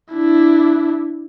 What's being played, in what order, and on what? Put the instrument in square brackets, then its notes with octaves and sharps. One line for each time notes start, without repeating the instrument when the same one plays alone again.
[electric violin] D4 E4